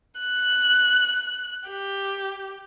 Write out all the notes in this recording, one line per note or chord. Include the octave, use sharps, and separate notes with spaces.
F#6
G4